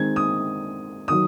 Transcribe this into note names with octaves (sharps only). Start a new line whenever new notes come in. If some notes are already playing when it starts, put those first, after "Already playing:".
Already playing: D#3 G#3 C4 D#4 G#6
D#6
D#3 F#3 D#6